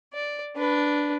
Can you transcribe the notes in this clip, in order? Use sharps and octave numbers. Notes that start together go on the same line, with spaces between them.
D5
D4 B4